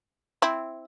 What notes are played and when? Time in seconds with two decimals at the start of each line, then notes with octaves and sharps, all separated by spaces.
0.42 C4 E4